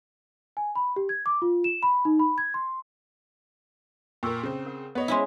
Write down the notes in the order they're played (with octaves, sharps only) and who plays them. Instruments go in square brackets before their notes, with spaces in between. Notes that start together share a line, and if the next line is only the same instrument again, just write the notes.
[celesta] G#5
B5
G4
G#6
D6
F4
E7
B5
D#4
B5
G#6
C6
[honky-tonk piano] A#2 A#4 [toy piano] G5 C#6 E6
[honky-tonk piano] C#3 C4
[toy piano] A#4 F#5
[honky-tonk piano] B3 C#5 D#5
[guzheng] G#3 C#4 E4 [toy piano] C5 C6